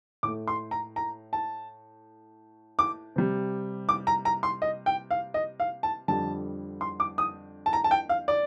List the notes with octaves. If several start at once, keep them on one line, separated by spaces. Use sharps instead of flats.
A2 A3 D6
C6
A#5
A#5
A5
D6
C3 G3
D6
A#5
A#5
C6
D#5
G5
F5
D#5
F5
A5
F2 D3 G3 A5
C6
D6
D#6
A5
A#5
A5
G5
F5
D5